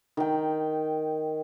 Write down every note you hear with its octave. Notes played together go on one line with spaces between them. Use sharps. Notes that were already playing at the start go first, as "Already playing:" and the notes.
D#3 G5